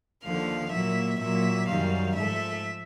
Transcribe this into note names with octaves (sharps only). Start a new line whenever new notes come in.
D#2 D3 F3 F5
A#2 F#3 A#3 E5
A#2 F#3 A#3 E5
F#2 D#3 G3 F5
G#2 F3 A3 E5